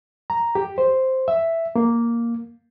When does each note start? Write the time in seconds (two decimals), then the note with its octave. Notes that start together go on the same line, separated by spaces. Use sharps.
0.30 A#5
0.55 G4
0.78 C5
1.28 E5
1.76 A#3